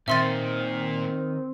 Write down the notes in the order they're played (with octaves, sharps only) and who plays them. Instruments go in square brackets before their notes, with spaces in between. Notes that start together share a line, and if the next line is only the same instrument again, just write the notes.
[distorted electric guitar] A#2 [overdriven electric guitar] D#3 [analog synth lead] C4 [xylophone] E5 C6 A6